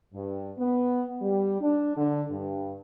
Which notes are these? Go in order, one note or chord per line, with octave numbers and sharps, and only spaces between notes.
G2
B3
G3
D4
D3
G2